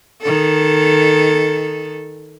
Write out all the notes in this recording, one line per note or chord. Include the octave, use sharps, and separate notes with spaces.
D#3 A4